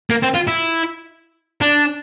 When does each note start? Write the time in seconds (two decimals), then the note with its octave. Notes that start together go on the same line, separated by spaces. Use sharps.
0.10 A#3
0.23 C4
0.35 F4
0.48 E4
1.61 D4